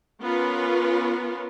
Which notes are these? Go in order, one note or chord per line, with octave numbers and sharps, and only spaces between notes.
B3 C#4 F4 A#4 B4